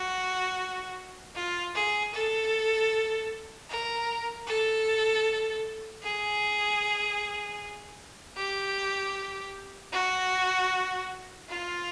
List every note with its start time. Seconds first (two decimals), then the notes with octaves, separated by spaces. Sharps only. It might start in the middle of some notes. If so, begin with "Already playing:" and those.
Already playing: F#4
1.36 F4
1.75 G#4
2.14 A4
3.70 A#4
4.48 A4
6.03 G#4
8.37 G4
9.92 F#4
11.49 F4